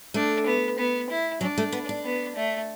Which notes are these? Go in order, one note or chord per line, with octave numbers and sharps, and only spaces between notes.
A3 D4
B3
B3
E4
F#3 D4
A3
B3
D4
B3
A3